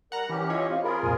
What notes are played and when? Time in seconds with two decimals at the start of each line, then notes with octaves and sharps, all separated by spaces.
0.12 G3 A#4 F#5 A#5
0.29 E3 C#4 G4
0.50 E4 F4 C#5 D#5
0.71 C4 F5
0.84 F4 G#4 A#4 B5
1.03 C2 F2 A#2 G#5